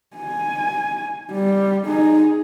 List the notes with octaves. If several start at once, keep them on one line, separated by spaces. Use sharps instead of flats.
G#5
G3
D#4 G#4